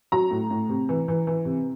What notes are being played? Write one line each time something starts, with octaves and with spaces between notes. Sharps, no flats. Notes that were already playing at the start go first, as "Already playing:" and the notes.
F#3 A#5
A2
A2
C3
E3
E3
E3
C3